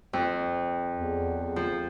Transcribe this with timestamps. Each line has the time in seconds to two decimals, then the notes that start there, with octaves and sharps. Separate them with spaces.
0.13 F2
0.97 E2
1.56 F3